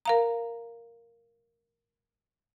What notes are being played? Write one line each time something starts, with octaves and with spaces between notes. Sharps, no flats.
A#4 F5 A#5